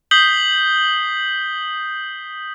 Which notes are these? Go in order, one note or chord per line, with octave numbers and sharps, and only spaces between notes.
D#6 G6 B6 C7 F#7 G7